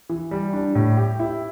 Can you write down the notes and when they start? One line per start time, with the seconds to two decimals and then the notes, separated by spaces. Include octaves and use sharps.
0.09 E3
0.31 G3
0.53 D4
0.75 A2
0.97 G4
1.19 E4